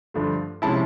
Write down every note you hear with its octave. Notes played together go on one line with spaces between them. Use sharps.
G2 D3 F3 A3
C3 F3 G#3 C#4 E4 A5 B5